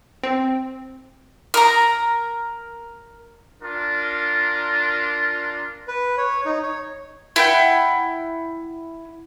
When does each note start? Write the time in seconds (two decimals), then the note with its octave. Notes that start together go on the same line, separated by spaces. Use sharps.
0.24 C4
1.54 A#4 A#5
3.61 D4 F4 A#4
5.88 B4
6.18 C#5
6.46 D#4
6.63 C#5
7.36 E4 F#5 G5